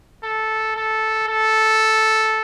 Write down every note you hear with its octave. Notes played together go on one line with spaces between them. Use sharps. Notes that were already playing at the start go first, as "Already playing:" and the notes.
A4
A4
A4